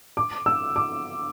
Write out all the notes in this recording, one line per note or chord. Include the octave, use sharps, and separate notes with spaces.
D6
E6
D6